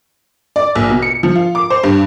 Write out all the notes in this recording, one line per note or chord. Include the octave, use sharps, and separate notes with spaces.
D5
A#1
B2
C#7
F3
F4
D6
C5
G2